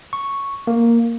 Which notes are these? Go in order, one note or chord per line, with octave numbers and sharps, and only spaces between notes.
C#6
A#3